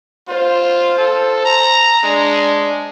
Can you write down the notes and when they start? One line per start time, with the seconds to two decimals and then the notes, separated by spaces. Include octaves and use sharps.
0.28 F4 C5
0.98 A4
1.45 A#5
2.03 G#3 D4